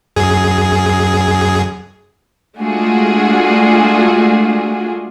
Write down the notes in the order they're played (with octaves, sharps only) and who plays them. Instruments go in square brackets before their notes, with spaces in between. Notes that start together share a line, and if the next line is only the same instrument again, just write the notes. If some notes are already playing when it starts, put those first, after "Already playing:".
[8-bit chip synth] F#2 G#4
[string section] G#3 A3 D4 F4 F#4 G#4